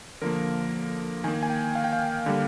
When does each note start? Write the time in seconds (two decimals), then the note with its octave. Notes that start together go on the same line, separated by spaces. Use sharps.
0.22 D3 F3 A#3 A#4
1.24 D#3 A#3 G#5
1.43 G#5
1.50 G5
1.75 F5
1.84 G5
1.93 F5
2.26 D3 G3 A#3